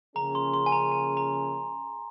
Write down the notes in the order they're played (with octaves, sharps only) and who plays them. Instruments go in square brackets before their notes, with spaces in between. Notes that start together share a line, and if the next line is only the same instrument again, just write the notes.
[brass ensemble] C#3 F3 A#3 C#4 G#4 [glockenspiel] A#5
[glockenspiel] C6
C6
G#5
A#5
G#5
A#5